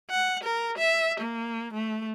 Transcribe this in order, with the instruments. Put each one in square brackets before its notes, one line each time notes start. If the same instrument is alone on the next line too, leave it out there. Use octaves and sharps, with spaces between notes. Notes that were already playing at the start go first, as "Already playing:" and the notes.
[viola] F#5
A#4
E5
A#3
A3